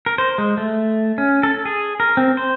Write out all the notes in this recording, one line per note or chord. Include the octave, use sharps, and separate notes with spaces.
A#4
C5
G#3
A3
C#4
A4
G#4
A#4
C4
C5